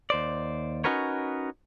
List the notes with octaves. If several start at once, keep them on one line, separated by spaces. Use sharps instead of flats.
D#2 C5 D5
C#4 D#4 F#4 A#4 B4 C#5